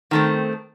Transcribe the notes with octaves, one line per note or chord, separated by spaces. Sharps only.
D#3 A3 C4